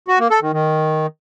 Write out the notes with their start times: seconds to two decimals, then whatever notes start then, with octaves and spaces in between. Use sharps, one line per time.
0.08 F#4
0.19 A#3
0.30 A4
0.42 D#3
0.53 D#3